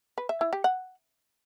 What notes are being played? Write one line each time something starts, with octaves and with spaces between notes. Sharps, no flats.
B4
E5
E4
G4
F#5